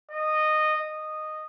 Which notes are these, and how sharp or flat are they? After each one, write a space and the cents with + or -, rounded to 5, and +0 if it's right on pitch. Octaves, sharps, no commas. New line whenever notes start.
D#5 -15
D#5 -10